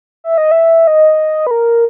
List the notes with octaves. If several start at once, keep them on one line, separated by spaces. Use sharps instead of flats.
E5
D#5
E5
D#5
B4
A#4